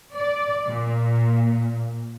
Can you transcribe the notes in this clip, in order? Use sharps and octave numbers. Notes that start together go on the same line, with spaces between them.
D5
A#2